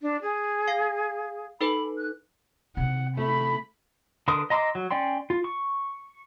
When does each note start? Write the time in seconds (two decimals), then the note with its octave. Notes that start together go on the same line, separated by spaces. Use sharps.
0.02 D4
0.22 G#4
0.68 F5 C7
1.61 D#4 A4 B4 B5
1.98 F#6
2.77 C3 F#5
3.17 A3 B5
4.28 D3 A#4 B4 C6 D#6
4.50 D#5 A#5 C6 D6 E6
4.75 F#3
4.91 C#4 D5 G5 C6
5.30 F4
5.44 C#6